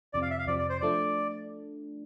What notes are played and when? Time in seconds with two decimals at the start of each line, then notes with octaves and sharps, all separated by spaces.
0.13 F2 C3 F3 C4 D5
0.22 F5
0.30 E5
0.39 F5
0.47 F2 C3 F3 C4 D5
0.59 D5
0.69 C5
0.81 F3 A3 D4 D5